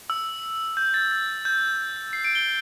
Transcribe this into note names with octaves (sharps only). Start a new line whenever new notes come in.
E6
G6
A6
A6
G6
C7
D7
G7